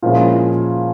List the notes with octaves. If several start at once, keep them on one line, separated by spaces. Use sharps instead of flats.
A#2 F3 G#3 C#4 E4